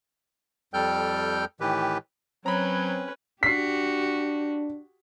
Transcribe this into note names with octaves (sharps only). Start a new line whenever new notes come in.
F2 G3 A4 G5 F6 G6
A2 D#3 E3 G4 B4
F#3 C4 C#4 B4 A#5 B5
D4 F#4 G4 B6 C7